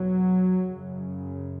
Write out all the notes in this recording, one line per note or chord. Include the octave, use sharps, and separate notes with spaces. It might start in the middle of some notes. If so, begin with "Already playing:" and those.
Already playing: E2 B2 F#3
F#2 C#3